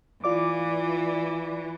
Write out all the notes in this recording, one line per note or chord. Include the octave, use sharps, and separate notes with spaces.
E3 F4 D5 D6